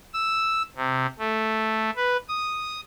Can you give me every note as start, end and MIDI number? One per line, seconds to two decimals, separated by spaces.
0.14 0.63 88
0.76 1.06 48
1.19 1.90 57
1.96 2.17 71
2.29 2.81 87